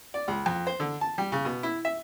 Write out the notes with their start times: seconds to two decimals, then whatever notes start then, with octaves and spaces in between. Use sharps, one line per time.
0.14 D5
0.28 C#2
0.46 F2
0.67 C5
0.80 D3
1.01 A5
1.18 G3
1.32 C#3
1.45 B2
1.63 E4
1.85 E5